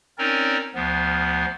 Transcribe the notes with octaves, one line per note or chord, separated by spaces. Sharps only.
C4 C#4 D#4 A#4 C#5 D5
D2 F3 B3